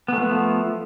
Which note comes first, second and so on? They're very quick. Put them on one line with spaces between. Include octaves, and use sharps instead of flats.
B3 A3 F3